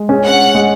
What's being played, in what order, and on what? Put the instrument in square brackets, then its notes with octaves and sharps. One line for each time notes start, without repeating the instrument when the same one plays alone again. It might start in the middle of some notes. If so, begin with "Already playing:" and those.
Already playing: [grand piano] G#3
C#4 G#4
[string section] F#5
[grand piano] G#3